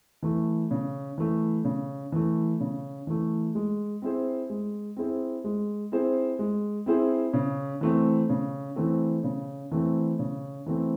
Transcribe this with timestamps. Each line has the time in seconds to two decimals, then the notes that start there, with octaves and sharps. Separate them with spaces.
0.23 E3 A3
0.71 C#3
1.18 E3 A3
1.64 C#3
2.12 E3 A3
2.60 C#3
3.07 E3 A3
3.55 G#3
4.02 C4 E4 G#4 C5
4.50 G#3
4.96 C4 E4 G#4 C5
5.44 G#3
5.92 C4 E4 G#4 C5
6.39 G#3
6.86 C4 E4 G#4 C5
7.33 C#3
7.81 E3 A3 C4
8.29 C#3
8.76 E3 A3 C4
9.24 C#3
9.72 E3 A3 C4
10.19 C#3
10.66 E3 A3 C4